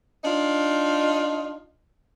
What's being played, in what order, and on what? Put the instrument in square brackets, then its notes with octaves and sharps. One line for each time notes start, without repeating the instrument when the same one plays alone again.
[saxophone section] D4 D#4 F4